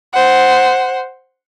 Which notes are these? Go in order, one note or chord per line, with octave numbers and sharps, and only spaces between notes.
C5 F#5